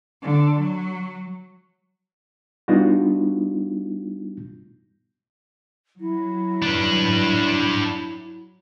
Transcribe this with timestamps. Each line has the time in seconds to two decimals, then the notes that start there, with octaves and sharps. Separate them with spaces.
0.22 D3
0.60 F#3
2.68 G3 B3 D4 D#4 F4 F#4
6.01 F#3 E4
6.62 D4 B4